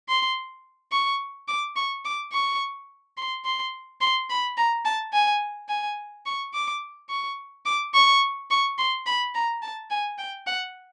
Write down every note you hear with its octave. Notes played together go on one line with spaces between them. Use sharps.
C6
C#6
D6
C#6
D6
C#6
C6
C6
C6
B5
A#5
A5
G#5
G#5
C#6
D6
C#6
D6
C#6
C#6
C6
B5
A#5
A5
G#5
G5
F#5